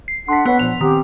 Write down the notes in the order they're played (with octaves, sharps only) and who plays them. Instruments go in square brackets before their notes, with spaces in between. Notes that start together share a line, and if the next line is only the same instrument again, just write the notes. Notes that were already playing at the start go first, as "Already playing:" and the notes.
[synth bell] C7
[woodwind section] D4 A4 F#5 [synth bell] C6 B6
[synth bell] B3 [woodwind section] B4 C#5 F#5
[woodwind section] A#2 F3 [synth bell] F7
[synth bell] D#3 [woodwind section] C4 G4